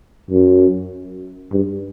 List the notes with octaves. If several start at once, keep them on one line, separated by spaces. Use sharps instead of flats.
F#2
G2